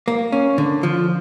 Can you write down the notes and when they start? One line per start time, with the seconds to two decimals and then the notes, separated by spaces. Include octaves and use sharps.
0.08 A#3
0.32 C#4
0.58 D3
0.83 F3